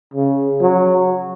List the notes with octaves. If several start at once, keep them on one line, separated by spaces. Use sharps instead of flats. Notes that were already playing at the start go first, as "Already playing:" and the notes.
C#3
F#3